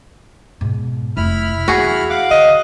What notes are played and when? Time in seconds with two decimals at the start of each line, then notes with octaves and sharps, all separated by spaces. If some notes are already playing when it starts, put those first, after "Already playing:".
0.61 G#2 B2
1.17 F1 D#2 E4 B5 F6
1.68 E2 F#4 G#4
2.10 F5 F#5 D6
2.31 D3 D#5